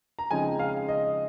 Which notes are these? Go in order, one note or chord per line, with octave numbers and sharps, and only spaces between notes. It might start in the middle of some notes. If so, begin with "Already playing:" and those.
A#5
C#3 F3 G#3 C4 D#4 G#5
F5
D#5